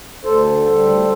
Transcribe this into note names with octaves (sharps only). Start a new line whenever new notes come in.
D2 A4 C5
D3
G3
D2